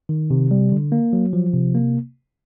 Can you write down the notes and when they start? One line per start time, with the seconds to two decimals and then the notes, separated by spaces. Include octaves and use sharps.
0.09 D#3
0.30 C3
0.51 G3
0.72 D3
0.92 A#3
1.13 F#3
1.33 F3
1.54 C3
1.75 A#3